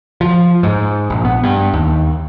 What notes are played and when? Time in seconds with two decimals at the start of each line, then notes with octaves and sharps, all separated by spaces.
0.21 F3
0.63 G#2
1.10 A#1
1.25 B3
1.43 G2
1.73 D#2